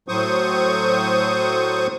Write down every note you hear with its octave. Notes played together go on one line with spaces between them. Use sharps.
A2 F#3 C5 C#6 D#6